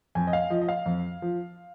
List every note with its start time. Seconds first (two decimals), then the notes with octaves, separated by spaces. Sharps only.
0.15 F2 G#5
0.27 D#5
0.33 F5
0.50 F3 D#5
0.61 D#5
0.69 F5
0.86 F2
1.22 F3